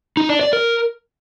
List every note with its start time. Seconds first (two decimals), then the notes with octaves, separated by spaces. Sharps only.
0.17 D#4
0.29 D4
0.41 D5
0.53 A#4